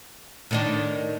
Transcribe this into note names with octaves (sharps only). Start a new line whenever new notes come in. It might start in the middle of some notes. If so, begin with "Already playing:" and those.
A2 D#3 D4